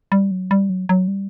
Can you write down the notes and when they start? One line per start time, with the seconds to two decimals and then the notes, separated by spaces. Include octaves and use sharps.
0.12 G3
0.31 F#3
0.51 G3
0.70 F#3
0.89 F#3
1.08 G3